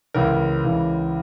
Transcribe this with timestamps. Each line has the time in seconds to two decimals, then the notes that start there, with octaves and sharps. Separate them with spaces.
0.14 C#2 C#3 E3 A#4
0.64 C#2 C#3 E3